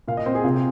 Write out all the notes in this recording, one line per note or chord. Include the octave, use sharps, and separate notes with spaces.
A#2 F5
D#5
C4 C5
G#4
C3 F4